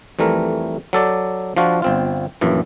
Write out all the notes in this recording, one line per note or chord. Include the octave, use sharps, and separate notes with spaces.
F2 E3 G3 A3 A#4
F#3 A4 D5
F3 D4 F4 F#4
G1 C4 F4
A#1 F#2 E3